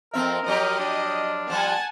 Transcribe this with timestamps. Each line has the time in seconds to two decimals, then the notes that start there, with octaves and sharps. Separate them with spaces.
0.13 F2 F3 C4 A#4 E5
0.46 F3 F#3 G4 D#5
0.79 D4
1.50 F3 G3 F#5 G#5 A5